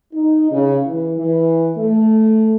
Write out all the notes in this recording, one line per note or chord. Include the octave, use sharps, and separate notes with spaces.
D#4
C#3
E3
E3
A3